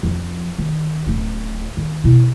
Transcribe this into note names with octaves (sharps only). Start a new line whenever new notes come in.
F2 F3
D#3
D1 C#4
D#3
B2 E4